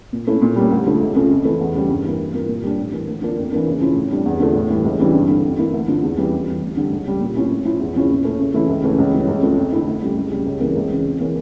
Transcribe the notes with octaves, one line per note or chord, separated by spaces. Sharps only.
A#2
A3 C#4 E4
A#2
G3 A#3 C#4
D2
D3 F3 A3
C#2
C#3 F3 A3
F2
E3 A3 E4
E2
C#3 G3
G2
E3 A#3
G2
F3 A#3
A#2
G3 D4
A2
E3 A#3
D2
D3 F3 A#3 D4
F2
E3 A#3 D4
C#3
F3 C#4 E4
A2
G3 D4
E2
D3 F3 A3 D4
A2
E3 G3
C#2
C#3 E3 G3 D4
G2
D3 A3
F2
E3 A#3 E4
D2
D3 F3
E2
E3 G3 C#4
F2
E3 G3
D2
D3 G3
C#2
C#3 G3
A#2
F3 C#4 E4
A2
F3 C#4 E4
E2
C#3 F3 C#4 E4
A#2
A3 C#4
C#3
E3 A3 C#4 E4
C#2
C#3 E3 A3 C#4
C#2
C#3 E3 G3
C#2
C#3 F3 A3
F2
D3 A3 E4
D2
C#3 G3
C#2
C#3 G3
C#2
C#3 E3 A#3
C#2
C#3 E3
F2
C#3 E3 A#3 C#4